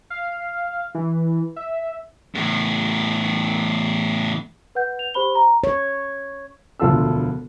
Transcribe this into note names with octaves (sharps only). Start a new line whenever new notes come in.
F5
E3
E5
E2 A2
B4 F#5 G6
F7
G4 C5 B5 G7
A#5
C#5
E1 D2 F3 F4 A4 E6